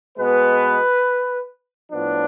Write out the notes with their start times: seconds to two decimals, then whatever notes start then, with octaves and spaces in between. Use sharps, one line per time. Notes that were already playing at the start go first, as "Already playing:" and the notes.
0.18 B2 G#3 B3 B4
1.92 A2 F3 B3 D4